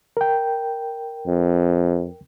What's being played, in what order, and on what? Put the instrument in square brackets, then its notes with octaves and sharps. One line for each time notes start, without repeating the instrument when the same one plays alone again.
[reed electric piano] A#4 G5
[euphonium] F2